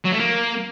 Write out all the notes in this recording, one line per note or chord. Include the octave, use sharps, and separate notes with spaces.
F#3
A3
A#3